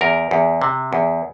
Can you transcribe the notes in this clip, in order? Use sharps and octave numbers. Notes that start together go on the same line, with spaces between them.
E2 A#4
E2
C3
E2